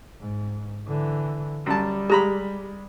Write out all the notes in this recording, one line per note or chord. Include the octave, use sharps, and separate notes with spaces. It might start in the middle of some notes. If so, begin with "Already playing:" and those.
G#2
D3 E3
F#2 G3 A5
G#3 G4 A#5 B5